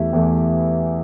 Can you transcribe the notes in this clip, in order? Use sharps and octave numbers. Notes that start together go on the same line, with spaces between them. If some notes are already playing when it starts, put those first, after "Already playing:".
Already playing: E2 E3 A3 E4 G4
E2 E3 A3